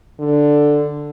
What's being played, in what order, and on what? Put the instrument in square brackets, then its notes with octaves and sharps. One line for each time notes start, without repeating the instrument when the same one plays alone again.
[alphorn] D3